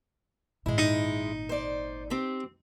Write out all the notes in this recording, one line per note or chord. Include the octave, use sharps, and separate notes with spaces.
G#1 A#2 G#3 E4
D#4
C5 D5
C4 G4